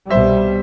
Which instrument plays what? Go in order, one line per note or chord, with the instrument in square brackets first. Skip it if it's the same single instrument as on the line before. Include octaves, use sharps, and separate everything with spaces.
[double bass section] C2 B2 G3 [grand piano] C5 E5